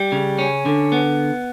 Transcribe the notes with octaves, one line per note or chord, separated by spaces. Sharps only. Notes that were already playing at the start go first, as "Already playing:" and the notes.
Already playing: G3
C#3
C#4
D3
B3